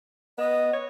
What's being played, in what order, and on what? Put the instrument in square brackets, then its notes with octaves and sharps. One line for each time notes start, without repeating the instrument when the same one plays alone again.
[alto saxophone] B3 [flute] D#5
[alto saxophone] C#5